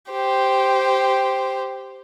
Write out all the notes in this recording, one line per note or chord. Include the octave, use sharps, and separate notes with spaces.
G4 C5